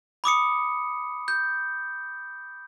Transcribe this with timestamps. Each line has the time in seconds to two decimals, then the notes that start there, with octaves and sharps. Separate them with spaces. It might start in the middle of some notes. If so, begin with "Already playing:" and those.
0.24 B5 D6 D#6 C#7
1.28 G6